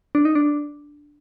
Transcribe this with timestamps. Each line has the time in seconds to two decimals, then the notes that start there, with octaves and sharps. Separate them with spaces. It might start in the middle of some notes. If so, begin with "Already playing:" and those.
0.15 D4
0.25 D#4
0.35 D4